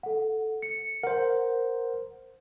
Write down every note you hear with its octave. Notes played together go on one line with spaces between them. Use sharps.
A4 F#5
C#7
A#4 C5 F#5